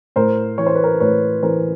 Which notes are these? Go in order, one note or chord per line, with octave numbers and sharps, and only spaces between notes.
A2 A#4 C5
E3 C#5
C5
B4
A#4 C5
A2 B4 C#5
E3 A#4 C5